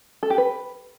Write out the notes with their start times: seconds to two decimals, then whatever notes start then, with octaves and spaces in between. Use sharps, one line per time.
0.23 A4
0.30 G4
0.38 B4